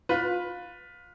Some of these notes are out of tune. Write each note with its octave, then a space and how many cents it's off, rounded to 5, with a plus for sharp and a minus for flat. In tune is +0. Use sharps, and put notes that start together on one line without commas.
F4 +25 B4 +5